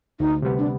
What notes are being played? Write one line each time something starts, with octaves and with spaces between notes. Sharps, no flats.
D2 D#4
C3 G3 B3
D4